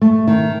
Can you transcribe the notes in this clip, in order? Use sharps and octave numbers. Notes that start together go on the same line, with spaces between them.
A3
D#3